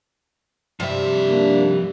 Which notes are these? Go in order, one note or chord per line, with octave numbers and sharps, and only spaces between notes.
G2 C3 F3 G3 E5
A#3 D4